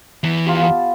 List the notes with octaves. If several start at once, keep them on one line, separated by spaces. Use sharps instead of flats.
E2 E3
F4 G4
B3 A5